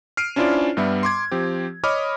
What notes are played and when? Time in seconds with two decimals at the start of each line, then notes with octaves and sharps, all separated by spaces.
0.17 F6 C7 D7 D#7
0.36 C#4 D4 E4 F4 C5 D5
0.77 G2 G3 B3 E5
1.03 C6 D6 G#6
1.31 F3 C4 G4
1.84 C#5 D#5 B5 D6 D#6 F6